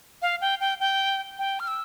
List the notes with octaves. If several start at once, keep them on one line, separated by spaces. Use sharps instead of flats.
F5
G5
G5
G5
G5
F6
E6